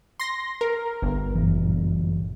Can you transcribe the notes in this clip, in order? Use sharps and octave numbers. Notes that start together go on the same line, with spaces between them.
C6 A#6
A#4
G1
F#2 A#2 E3